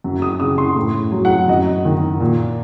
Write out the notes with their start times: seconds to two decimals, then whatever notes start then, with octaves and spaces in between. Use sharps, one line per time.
0.04 F#2
0.22 D#6
0.40 C#3 D#6
0.58 C6
0.76 A2
1.12 F#3
1.25 F#5
1.48 F#2 D#5
1.85 D#3
2.20 A#2